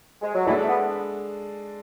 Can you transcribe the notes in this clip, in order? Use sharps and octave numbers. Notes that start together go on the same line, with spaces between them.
G#3
F#3
E3 G#3 D4 A4
A3
B3